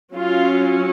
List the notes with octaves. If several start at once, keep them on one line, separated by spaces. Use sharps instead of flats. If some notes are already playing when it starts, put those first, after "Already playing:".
F#3 C#4 F4